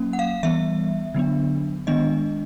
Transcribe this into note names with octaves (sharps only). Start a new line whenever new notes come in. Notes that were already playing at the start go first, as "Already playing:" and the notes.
Already playing: F#3 A#3 C#4
F#5
F5
E3 G3 B3 E5
D3 F#3 B3 D4
D#3 G#3 B3 D4 D#5